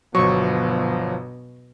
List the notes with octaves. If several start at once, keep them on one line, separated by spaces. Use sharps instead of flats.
G1 B2 F3 F#3 C#6